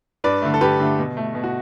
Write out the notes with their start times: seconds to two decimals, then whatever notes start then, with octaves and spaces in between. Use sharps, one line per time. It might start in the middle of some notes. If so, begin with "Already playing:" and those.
0.24 G2 B4 D5
0.42 D3 A3
0.54 A4
0.61 G2 G4 B4
0.80 D3 A3
0.99 B2
1.17 A3
1.35 B2
1.44 F#4